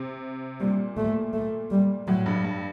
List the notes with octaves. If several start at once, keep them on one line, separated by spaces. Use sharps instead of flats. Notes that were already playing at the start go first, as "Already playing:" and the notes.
Already playing: C3
A#2 G3
A3
A3
G3
A2 F#3
G2
G2